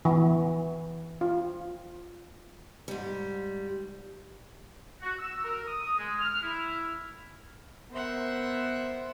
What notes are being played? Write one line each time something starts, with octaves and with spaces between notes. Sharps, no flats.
E3
F4
G#2 G3
F#4
E6
A#4
D#6
G#3
F6
E4
B3 A#4 C5 E5 F#5